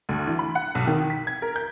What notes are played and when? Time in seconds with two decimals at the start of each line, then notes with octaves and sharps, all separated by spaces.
0.09 D2
0.27 E3
0.39 B5
0.55 F#5
0.75 B1
0.87 D#3
1.10 B6
1.27 G#6
1.42 A#4
1.56 G6